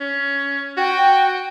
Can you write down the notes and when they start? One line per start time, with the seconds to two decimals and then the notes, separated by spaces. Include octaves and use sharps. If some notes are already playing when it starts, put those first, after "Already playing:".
0.01 C#4
0.78 F#4 G5